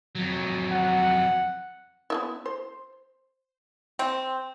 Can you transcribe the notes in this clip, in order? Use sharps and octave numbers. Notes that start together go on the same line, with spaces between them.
F2 F#3
F#5
B3 D#4 E4
C5
C4